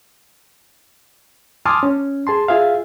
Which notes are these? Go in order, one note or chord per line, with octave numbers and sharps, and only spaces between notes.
G#5 A5 C6 D6 D#6 F6
C#4
G#4 A5 C6
F4 G#4 E5 F5